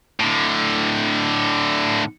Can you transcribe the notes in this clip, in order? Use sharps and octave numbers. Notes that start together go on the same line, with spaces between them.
A2 D3